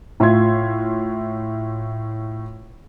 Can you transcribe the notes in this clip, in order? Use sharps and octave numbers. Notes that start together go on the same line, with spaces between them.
A2 F4 E5 C6 G#6